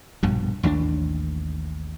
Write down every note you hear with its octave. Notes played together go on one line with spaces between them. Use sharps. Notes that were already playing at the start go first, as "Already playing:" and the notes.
A#1 G2 B2
A1 D#2 A3 D4